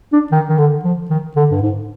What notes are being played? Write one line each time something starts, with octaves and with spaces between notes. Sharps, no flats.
D4
D#3
D#3
D3
F3
D#3
D3
G2
G#2